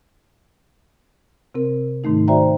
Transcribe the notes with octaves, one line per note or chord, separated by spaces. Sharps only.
C3 C4 A#4
G#2 D#3 A3 D#4
F#4 C5 D5 E5 G5 A#5